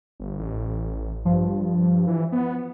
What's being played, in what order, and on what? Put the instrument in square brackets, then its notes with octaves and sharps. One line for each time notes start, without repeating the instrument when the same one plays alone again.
[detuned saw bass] G1
A1
[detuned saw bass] G2 [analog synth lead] F3
[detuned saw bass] E3
B3